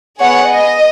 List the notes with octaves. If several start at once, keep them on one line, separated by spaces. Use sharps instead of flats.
B3 G#4 C#5 F#5
D#5